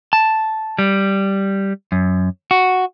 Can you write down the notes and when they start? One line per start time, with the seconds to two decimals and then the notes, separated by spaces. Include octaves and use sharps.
0.13 A5
0.79 G3
1.92 F#2
2.51 F#4